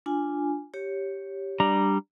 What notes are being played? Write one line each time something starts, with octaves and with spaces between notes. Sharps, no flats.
D4 F4 G#5
G4 C#5
G3 D4 A#5